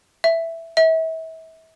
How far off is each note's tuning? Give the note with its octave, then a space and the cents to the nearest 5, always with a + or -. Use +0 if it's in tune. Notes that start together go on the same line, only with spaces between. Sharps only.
E5 +5
E5 -35